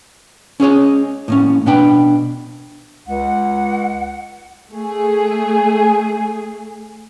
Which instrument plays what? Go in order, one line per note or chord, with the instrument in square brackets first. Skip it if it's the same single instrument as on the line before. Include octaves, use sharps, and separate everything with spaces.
[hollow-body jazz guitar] C#4 G#4 C#5 D#5
A2 A#3 C#4
B2 B3 D4 G5 B5
[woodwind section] C#2 [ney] F#5
[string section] A3 G#4